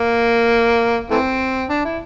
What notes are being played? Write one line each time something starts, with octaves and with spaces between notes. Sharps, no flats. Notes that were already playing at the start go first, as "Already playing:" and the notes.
Already playing: A#3
E3 A3 C4
D4
E4